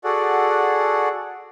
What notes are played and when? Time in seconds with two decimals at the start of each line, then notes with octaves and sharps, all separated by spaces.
0.04 F#4 G#4 A4 D5 F#5